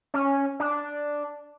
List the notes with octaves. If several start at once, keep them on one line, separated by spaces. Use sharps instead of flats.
C#4
D4